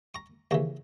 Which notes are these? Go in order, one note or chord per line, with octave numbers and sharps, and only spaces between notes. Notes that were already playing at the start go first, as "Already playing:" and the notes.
A#5 C#6
D#2 C#3 E3 A#5 C#6